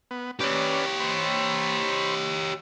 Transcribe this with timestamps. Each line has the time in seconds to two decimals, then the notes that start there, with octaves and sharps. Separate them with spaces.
0.11 B3
0.40 C#4 G4 B4 C#5 D5
1.00 C5 B5 C#6